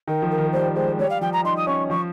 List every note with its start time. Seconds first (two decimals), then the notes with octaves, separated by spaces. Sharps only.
0.08 D#3 A#4
0.22 F3
0.30 A#4
0.38 D#3
0.52 G3 C5
0.75 G#3 C5
0.98 G3 C#5
1.09 F5
1.21 F3 G5
1.32 A#5
1.44 D#4 C6
1.56 D#6
1.67 C#4 C#6
1.90 F3 C#6